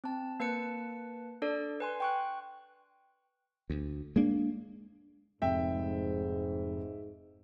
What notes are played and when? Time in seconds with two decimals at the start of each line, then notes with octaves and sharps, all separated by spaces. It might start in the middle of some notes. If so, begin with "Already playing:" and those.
0.04 C4 A5
0.40 A#3 B4 A5 C#7
1.42 D4 A4 D5
1.80 B4 G#5 C6
2.00 G5 C#6 F#6
3.70 D2
4.16 G#3 A#3 D4
5.42 F1 G#2 E5 G5